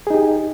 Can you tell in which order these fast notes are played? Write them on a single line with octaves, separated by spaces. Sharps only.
G#4 D#4 G4